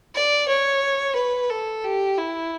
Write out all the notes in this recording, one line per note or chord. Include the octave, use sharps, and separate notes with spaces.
D5
C#5
B4
A4
G4
E4